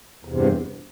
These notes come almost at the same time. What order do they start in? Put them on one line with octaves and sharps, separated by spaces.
E2 C3 G2